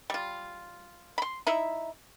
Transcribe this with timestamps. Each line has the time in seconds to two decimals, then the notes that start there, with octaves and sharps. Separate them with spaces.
0.10 G3 F4
1.18 B5 C6
1.47 D#4 E4 E5